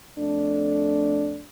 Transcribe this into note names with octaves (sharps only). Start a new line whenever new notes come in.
F2 A3 D4